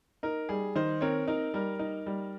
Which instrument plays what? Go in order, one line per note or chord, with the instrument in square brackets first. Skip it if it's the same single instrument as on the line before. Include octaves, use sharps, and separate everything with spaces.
[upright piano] D#4 [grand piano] A#4
[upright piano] G3 [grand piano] G#4
[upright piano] D#3 [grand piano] C5 D#5
[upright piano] C4 [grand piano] A#4 C#5
[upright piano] D#4 [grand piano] A#4
[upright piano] G3 [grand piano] A#4
[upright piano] D#4
G3